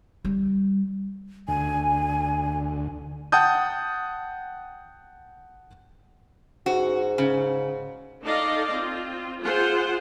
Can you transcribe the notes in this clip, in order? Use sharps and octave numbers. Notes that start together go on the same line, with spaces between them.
G3
D2 G#5
F#5 G5 A5 D#6 G6
G#2 F#4
C#3
D#4 A4 D5 D#5 F5
C4 F4
F4 G#4 C5 F#5